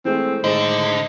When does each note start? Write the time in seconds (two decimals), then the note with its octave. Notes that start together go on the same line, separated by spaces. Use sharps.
0.05 E3 G#3 A3 C4
0.44 A2 D3 D#3 G#3 C5 D#5